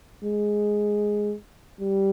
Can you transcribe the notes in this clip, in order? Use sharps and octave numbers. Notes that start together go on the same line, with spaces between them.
G#3
G3